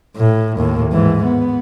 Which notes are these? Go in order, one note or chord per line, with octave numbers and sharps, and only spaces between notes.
A2
D#2 A2
G#2 E3
B3